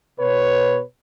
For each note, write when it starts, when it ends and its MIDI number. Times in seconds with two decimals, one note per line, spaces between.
0.20 0.81 47
0.20 0.81 71
0.20 0.81 73